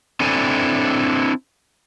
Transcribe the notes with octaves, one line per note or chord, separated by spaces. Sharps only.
C4 D4 E4 A4 G#5